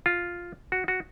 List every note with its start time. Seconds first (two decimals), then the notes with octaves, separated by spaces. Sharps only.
0.06 F4
0.72 F#4
0.88 F#4